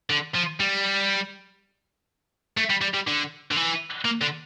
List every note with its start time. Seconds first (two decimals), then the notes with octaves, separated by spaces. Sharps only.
0.10 D3
0.35 F3
0.60 G3
2.57 A3
2.70 G3
2.81 G3
2.94 G3
3.07 D3
3.51 D3
3.56 E3
4.05 A#3
4.22 D3